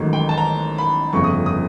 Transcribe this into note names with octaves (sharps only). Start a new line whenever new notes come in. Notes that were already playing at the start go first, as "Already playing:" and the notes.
Already playing: A1 G#2 D#3 F#3 A3
G5
A5
A#5
B5
G1 F2 C#3 C#6
D#6
D#6